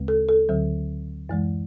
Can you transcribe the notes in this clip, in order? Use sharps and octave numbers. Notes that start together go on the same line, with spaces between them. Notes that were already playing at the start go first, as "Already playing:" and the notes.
Already playing: D2 C#3 G#3
A4
A4
D2 D3 F#3
F#2 E3 G#3